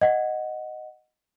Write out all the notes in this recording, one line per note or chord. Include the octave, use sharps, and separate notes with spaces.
D#5 F#5